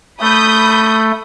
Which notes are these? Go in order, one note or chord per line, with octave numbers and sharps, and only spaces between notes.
A3 B5 D#6 G6